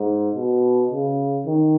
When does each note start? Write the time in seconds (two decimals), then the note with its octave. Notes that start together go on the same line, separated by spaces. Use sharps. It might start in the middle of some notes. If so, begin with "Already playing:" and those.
Already playing: G#2
0.35 B2
0.91 C#3
1.46 D#3